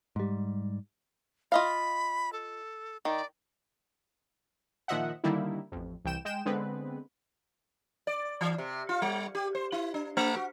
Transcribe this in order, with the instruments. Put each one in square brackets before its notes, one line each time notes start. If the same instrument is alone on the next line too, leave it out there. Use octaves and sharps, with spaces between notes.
[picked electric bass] G#2 G3
[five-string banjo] F4 D#5 F5 [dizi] B5
[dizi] A4
[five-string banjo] D#3 [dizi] D5
[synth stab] A#2 D#3 F3 D#5 E5 F#5
D3 D#3 G3 A#3 D#4 E4
A1 F2
C2 E3 G5 E7
G#3 G5 E7
D3 G#3 B3 C4 B4
[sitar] D5
E3
C3
F4
G3
G4
C5
E4
D4
A3
F#4